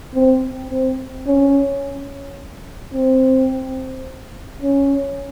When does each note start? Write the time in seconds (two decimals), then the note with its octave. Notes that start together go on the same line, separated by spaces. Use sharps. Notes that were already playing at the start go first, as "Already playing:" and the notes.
0.15 C4
0.71 C4
1.27 C#4
2.94 C4
4.62 C#4